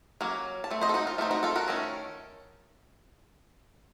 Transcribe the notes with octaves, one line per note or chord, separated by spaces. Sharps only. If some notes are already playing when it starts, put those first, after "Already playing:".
F#3 A#3 C#4
A5
A3 C4
C5 D#5
A4
D#4 F#4
F4
A3 C4 D#4 F4
D#4 F#4
F4 A4
F#4 A#4
D#3 A3 C#4